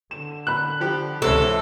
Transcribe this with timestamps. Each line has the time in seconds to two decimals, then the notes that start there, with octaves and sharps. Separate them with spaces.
0.11 D3 E7
0.47 B5 F#6
0.81 F3 G4
1.22 C#2 G#2 C3 E3 G#3 C#4 A4